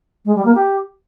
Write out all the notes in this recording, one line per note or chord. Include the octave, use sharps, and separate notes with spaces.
G#3
G3
A#3
G4